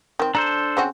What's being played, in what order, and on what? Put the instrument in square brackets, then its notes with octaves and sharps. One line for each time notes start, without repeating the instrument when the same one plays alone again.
[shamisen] D#3 C4
[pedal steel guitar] D4 A4 C5 [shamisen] A#5
[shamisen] C#3 C4 F#4